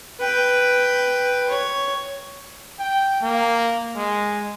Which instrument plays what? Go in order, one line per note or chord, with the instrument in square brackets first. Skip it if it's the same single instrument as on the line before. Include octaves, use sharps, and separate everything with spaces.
[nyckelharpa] B4 G5
C#5
[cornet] G5
A#3
G#3